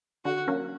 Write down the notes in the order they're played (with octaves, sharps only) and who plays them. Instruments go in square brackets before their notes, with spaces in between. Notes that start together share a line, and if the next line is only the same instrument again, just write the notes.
[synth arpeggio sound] D3 [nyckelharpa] F#4
[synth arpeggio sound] F#3 A#3 C#4